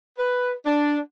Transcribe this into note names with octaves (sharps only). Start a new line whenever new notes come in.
B4
D4